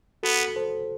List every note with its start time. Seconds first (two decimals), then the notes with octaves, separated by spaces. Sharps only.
0.23 B3 F#4 A4
0.56 A4 C5